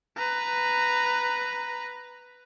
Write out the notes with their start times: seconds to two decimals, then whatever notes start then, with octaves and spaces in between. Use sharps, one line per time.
0.17 B4 A#5